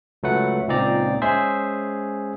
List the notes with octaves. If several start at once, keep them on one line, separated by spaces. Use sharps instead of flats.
C#2 F#3 A3 B4 F#5
C#2 A#2 C4 D#4 D5 A#5
G#3 C#4 G#4 C5 E5